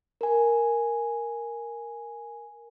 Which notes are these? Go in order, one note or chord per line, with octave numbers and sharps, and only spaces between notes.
A#4 G#5